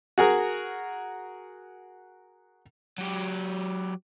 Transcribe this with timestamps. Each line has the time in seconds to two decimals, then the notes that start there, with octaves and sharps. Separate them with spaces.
0.18 F#4 G#4 A#4
2.98 F#3 G4